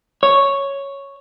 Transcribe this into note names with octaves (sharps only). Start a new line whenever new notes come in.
C#5